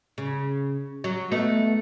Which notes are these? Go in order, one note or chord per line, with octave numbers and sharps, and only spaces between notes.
C#3
F#3
A3 B3 D#4